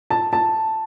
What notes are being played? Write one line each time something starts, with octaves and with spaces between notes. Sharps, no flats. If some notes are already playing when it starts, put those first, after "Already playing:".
A5
A5